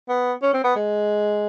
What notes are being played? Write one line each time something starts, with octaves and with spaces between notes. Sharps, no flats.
B3
C#4
C4
B3
G#3